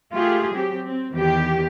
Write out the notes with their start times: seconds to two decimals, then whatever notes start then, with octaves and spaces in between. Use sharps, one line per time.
0.12 A3 F4 G4 G#4
0.54 F#3 C4 G4
0.86 C4
1.14 E2 D#3 G4